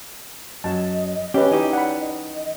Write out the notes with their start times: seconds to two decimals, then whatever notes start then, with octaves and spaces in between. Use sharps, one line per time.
0.64 F#2 F#3 D#5 A5
1.34 C#4 G4 B4
1.51 E3 D#4 G4 D#5
1.73 D5 F#5 B5
2.00 D#5